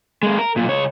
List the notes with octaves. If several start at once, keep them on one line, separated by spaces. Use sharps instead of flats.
G#3 A#3
A#4
B1 A#2
C#2 C#5